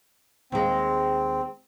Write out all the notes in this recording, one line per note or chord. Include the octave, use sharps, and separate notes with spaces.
D#2 G#3 C4